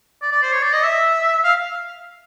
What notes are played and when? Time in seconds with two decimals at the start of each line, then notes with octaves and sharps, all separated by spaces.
0.22 D5
0.32 D5
0.43 C5
0.53 C#5
0.63 D5
0.73 D#5
0.83 E5
1.44 F5